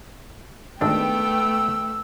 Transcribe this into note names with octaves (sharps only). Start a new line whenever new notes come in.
G#1 D#3 A3 B3 D4 G5 E6